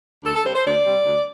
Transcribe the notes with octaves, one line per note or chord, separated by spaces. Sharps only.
D2 A4
A4
C3 G3 C4 C5
C5
D2 D5
C3 G3 C4
D2